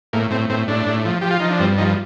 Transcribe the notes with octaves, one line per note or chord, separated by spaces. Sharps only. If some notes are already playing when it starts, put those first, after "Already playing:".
A2 A#3
A2 C4
A2 C4
A2 D4
A2
F3
F3 G4
F4
F3 D#4
D4
G2 C4
F3 D#4